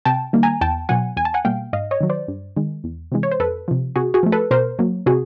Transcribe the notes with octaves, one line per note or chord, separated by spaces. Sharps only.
C3 G5 A5
D#3 G3 A#3
G#5 A#5
E2 G5 A5
B2 F#3 F#5 G#5
E2 G#5
A5
F#5 G#5
B2 G3 A#3 F5 G5
G#2 D#5 F5
C#5 D#5
D#3 F#3
C5 D5
G2
D#3 G#3
E2
C3 E3 G#3
C#5
C5
F2 A4 B4
C3 F3
C3 F#4 G#4
F#4 G#4
F3 A3
A4 B4
B2 A#4 C5
F#3 A#3
C3 F#4 G#4